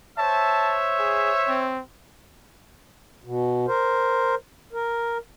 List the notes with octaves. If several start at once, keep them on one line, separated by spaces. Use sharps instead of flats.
C5 C#5 E5 A5
G#4
C4
B2
A#4 C5
A#4